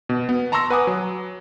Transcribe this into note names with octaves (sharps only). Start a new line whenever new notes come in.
B2
B3
A5 A#5 C6 C#6 E6 A#6
B4 F#5 G#5 D6 D#6
F#3